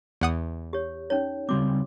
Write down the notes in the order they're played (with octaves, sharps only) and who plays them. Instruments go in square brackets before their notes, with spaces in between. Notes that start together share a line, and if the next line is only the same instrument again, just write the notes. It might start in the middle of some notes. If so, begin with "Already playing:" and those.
[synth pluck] E2 F#5 D#6
[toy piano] G4 C#5
C#4 D#4 C#5
[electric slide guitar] C#3 G3 C4 [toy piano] F#4 D6